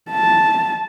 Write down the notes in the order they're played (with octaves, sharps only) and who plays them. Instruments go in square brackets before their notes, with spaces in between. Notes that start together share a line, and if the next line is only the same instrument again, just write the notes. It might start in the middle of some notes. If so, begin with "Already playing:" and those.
[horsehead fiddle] A5